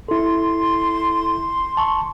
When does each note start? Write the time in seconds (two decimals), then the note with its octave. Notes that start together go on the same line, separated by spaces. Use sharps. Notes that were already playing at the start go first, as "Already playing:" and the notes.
0.09 E4 A4 C6
1.77 A5 C#6